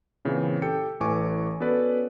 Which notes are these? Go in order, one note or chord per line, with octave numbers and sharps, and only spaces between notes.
A#2 C#3 E3 C4
G4 A4 G5 C#7
A1 E3 A4 G#5 C#6 D6
B3 C#4 F#4 A4 B4 D5